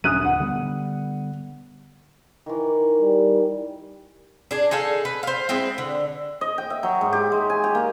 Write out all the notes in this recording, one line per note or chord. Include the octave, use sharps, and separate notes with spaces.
D2 A#2 F#3 D#6 F#6 D#7
F#5
D3 G3 B3
D#3 E3
G3
D4 G#4
D#4 G#4 A4 F5
B4
C5 F5
G#3 C4 E4
D3
D#5
G5
E5
F#3
G#2
G4
G#3
G#5
G4
A#3